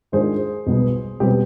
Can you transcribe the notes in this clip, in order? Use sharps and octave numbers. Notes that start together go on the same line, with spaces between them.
G#2 D#3 G#3 D4 F4 G#4 C5
B1 B2 G3 B3
B2 G3 C4 G4 B4